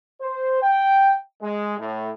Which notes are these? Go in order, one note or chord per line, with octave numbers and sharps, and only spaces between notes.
C5
G5
G#3
A2